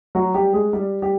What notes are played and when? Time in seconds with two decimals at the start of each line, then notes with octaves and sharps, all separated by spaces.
0.15 F#3 F#4
0.34 G3 G4
0.53 G#3 G#4
0.73 G3 G4
1.02 G3 G4